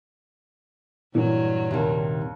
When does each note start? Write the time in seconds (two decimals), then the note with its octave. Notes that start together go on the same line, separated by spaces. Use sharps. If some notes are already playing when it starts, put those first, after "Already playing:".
1.15 G2 A#2 E3 F#3
1.71 D#2 C3 D#3